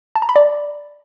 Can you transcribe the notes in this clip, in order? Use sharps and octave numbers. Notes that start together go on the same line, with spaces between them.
A5
A#5
B5
D5